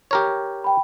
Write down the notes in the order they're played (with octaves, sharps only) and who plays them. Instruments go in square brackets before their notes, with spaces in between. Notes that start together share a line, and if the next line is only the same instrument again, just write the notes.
[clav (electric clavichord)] G4 A#4 C#5
[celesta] G5 B5